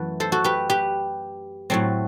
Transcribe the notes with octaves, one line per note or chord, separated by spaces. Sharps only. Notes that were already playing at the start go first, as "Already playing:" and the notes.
Already playing: F#2 E3 A3 B4
A4 C5
F#4 A4
G4 B4
G4 B4
A2 F#3 A3 C4